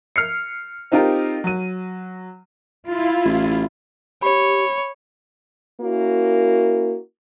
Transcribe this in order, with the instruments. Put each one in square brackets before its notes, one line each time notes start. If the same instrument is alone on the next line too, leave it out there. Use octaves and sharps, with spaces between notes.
[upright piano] F6 C7 C#7
C4 D#4 F4 G4 A#4
F#3 D#7
[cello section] E4 F4
[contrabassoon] A1
[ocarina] G4 [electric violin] C#5 [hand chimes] B5
[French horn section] A#3 C#4 E4 F#4 A#4